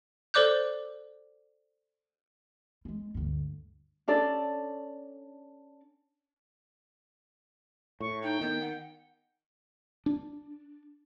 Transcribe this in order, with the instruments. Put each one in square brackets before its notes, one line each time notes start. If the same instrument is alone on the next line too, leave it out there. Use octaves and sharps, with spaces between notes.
[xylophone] A4 C5 D5 D6 F#6 G6
[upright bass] G3 G#3
D2 G2
[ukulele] C#4 D4 A4 D5
[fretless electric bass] A2 [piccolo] C#6
[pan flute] D#4 [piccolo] G5
[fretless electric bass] D#3 [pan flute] B3
[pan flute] F#5
[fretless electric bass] D4